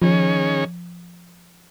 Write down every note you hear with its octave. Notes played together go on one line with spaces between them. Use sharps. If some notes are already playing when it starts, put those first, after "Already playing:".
D#3 F3 C#4 G#4 C#5